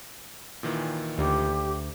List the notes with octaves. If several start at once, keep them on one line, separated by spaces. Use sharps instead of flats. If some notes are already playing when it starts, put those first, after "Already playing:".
A#2 D#3 E3
D2 G4